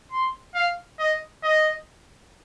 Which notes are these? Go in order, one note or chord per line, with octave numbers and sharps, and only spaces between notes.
C6
F5
D#5
D#5